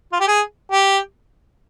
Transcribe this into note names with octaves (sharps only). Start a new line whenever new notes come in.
F4
G4
G#4
G4